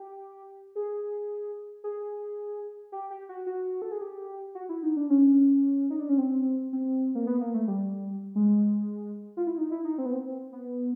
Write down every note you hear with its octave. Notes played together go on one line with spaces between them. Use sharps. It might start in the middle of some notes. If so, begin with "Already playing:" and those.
Already playing: G4
G#4
G#4
G4
G4
F#4
F#4
A4
G#4
G4
F#4
E4
D#4
D4
C#4
D#4
D4
C#4
C4
C4
A#3
B3
A#3
A3
G3
G#3
F4
E4
D#4
E4
D#4
C4
B3
C4
B3